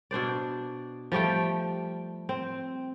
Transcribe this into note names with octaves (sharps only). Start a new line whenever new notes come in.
B2 D4 C5 D5
F3 G3 A3 G5
C4